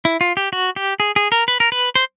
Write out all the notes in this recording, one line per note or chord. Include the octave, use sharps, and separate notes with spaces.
E4
F4
G4
F#4
G4
G#4
G#4
A#4
B4
A#4
B4
C5